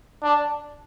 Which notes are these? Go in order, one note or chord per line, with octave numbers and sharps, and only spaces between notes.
D4